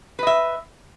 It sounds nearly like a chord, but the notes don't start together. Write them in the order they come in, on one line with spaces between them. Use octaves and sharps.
B4 D#5 E5